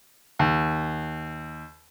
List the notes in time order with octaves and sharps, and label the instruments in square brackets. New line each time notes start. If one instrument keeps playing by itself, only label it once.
[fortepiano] D#2